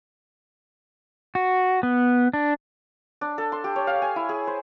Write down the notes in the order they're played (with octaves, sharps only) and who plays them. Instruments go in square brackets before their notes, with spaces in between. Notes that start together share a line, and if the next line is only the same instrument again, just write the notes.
[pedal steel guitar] F#4
B3
D4
[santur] D4
A4
C6
G4
C#5
F5
G#5
E4
G#4
C5